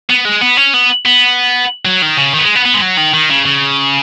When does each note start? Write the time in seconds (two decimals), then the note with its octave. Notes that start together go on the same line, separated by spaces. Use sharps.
0.10 B3
0.25 G#3
0.41 B3
0.57 C#4
0.74 B3
1.05 B3
1.85 F#3
2.02 D#3
2.17 C#3
2.33 D#3
2.39 B3
2.44 G#3
2.55 B3
2.66 B3
2.74 G#3
2.82 F#3
2.98 D#3
3.14 D#3
3.30 C#3
3.45 C#3